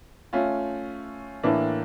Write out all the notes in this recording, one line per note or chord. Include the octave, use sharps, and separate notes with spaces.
A3 C#4 F4
A2 E3 A#3 D4